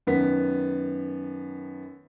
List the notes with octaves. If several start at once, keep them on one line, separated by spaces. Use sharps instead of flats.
F#2 D#3 B3 B6